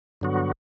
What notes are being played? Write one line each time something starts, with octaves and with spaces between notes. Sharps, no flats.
G2 D3 F#3 B3 F#4